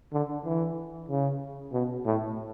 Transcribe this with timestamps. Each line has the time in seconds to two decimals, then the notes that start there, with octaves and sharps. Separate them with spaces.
0.13 D3
0.45 E3
1.09 C#3
1.73 B2
2.05 A2